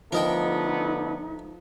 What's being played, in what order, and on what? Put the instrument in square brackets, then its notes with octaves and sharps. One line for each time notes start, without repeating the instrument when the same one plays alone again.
[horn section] D3 A3 B3 [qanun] F3 [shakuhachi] D#4 [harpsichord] A#4 D#5 G5